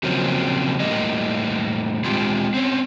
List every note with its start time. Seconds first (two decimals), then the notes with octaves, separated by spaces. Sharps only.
0.03 C#3 F3 F#3 A#3 C4 C#4
0.80 A2 G3 A#3 D#5
2.04 G#3 C4 F4 G4
2.54 C4 C#4